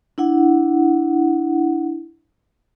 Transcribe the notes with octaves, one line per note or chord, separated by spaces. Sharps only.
D4 E4 F#5